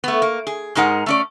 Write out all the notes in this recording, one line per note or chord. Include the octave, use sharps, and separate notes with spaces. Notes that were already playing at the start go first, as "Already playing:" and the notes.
A3 B3
A#3
G#4
G#2 G#3 D#4 A#4 F#5
A3 C#4 D5